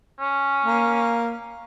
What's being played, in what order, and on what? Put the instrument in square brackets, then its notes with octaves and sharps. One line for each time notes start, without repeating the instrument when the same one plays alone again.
[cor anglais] C#4
[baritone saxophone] A#3